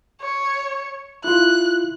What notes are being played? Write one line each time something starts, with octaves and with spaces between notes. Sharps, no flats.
C#5
E4 F4 F#6